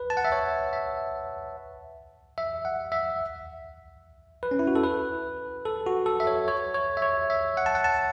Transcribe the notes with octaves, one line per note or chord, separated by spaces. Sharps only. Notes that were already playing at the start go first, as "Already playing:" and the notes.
Already playing: B4
A5
F#5
E5
C#5
E5
E5
F#5
E5
B4
C#4
E4
F#4
A4
B4
A4
F#4
A4
E5
C#5
C#5
C#5
E5
C#5
E5
F#5
A5
F#5
A5